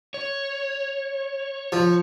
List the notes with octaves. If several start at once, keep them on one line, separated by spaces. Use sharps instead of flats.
C#5
F3